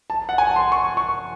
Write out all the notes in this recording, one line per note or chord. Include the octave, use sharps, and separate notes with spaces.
A5
F#5
G#5
A5
C6
C#6
C#6